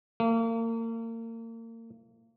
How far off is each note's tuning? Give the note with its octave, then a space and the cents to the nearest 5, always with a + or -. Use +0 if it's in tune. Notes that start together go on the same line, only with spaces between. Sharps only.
A#3 -35